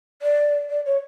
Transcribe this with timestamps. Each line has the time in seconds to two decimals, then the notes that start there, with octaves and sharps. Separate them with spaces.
0.22 D5
0.70 D5
0.86 C#5